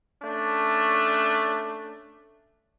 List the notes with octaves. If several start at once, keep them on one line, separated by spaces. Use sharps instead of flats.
A3 C#4 D4